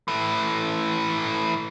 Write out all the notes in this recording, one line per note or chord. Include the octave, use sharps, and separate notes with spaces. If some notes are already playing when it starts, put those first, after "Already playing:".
E3 A3